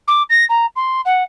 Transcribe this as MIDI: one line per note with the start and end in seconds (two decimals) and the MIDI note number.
0.08 0.23 86
0.30 0.45 94
0.49 0.66 82
0.76 1.01 84
1.05 1.24 78